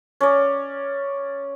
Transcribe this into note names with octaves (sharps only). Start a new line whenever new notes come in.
C#4 D5